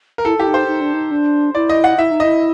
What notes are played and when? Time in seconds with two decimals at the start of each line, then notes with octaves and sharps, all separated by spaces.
0.18 A#4
0.25 E4 A4
0.38 E4 G4
0.47 D#4
0.54 C5
0.68 D#4
0.81 D4
0.94 D#4
1.11 D4
1.55 E4 D5
1.69 D#5
1.84 F#5
1.98 E4 E5
2.11 D#4
2.20 E4 D#5